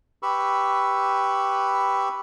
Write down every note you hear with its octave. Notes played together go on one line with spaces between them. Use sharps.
G4 B4 B5 C#6 E6